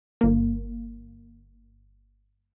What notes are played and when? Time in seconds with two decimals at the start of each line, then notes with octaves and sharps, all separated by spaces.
0.21 G1 A#3